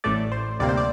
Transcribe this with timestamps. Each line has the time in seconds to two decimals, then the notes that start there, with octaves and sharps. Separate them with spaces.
0.04 A1 A2 A3 D5
0.32 C5
0.59 D2 C3 G3 A#3 D5
0.69 C5
0.77 D5